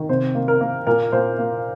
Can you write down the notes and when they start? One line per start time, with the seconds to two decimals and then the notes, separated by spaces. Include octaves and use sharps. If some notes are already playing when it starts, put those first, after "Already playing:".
Already playing: D#3
0.09 C3 C5
0.35 A#3
0.48 A#4
0.61 A#3
0.87 A#2 A#4
1.12 A#2 C5
1.39 A#3